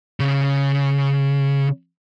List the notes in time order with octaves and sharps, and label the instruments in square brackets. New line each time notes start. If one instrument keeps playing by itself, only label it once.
[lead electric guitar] C#3